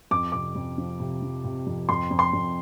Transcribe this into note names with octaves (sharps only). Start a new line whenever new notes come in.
F2 D6
C3 D6
F2
F3
C3
F3
C3
F2
F2 C6
F2
C6
F2